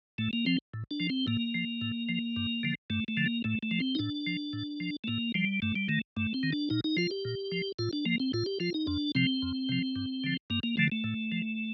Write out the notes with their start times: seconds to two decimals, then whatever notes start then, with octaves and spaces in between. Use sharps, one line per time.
0.18 A2 A3
0.33 A#3
0.46 F3 C4
0.74 A2
0.91 D4
1.00 F3
1.10 C4
1.27 A2 A#3
1.55 F3
1.81 A2
2.09 F3
2.36 G2
2.63 D3 F3
2.90 G2 A3
3.08 A3
3.17 D3 F3
3.26 A#3
3.44 A2 A3
3.63 A3
3.71 F3
3.80 C4
3.95 D#4
3.99 A2 D4
4.27 F3
4.53 A2
4.80 F3
5.04 A3
5.08 A2 A#3
5.35 F3 G3
5.62 G2 A3
5.76 G3
5.89 D#3 A3
6.17 G2 A3
6.34 C4
6.43 D#3
6.53 D4
6.70 A#2 D#4
6.84 D#4
6.97 F3 F4
7.11 G4
7.25 A#2
7.52 F3
7.79 A2 F4
7.93 D4
8.06 F3 A#3
8.20 C4
8.33 A2 F4
8.46 G4
8.60 F3 F4
8.74 D#4
8.87 F2 D4
9.15 C3 F3 C4
9.42 F2
9.69 C3 F3
9.96 G2
10.24 D3 F3
10.50 G2 A#3
10.63 A#3
10.77 D3 F3 A3
10.92 A3
11.04 A2
11.32 F3